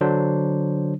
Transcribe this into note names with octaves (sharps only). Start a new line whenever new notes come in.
D3 F#3 D4 C5